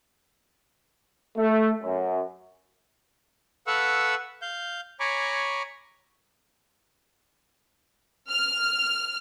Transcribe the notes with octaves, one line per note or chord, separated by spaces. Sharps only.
A3
F#2
A4 B4 F5 F#5 C#6 E6
F5 G6
C#5 G#5 A#5 B5 C#6 D6
F6